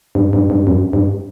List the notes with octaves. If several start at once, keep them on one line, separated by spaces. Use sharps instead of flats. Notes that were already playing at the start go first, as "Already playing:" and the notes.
G2
G2
G2
F#2
G2